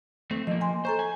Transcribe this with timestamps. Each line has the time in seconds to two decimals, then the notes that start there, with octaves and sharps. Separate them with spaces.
0.31 A3 C4
0.47 F3 A#3 D#5
0.61 G#5 C6
0.85 A4 C5 A#5 C#6
0.99 G#5